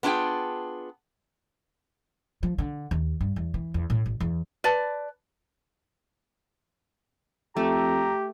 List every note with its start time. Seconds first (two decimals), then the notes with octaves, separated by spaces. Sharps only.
0.03 B3 D4 F4 G#4 G5
2.43 F3
2.58 D3
2.91 D#2
3.21 G2
3.36 E2
3.54 E3
3.74 E2
3.90 A2
4.06 A1
4.20 E2
4.64 B4 D5 A5
7.57 F2 A3 G4 A#5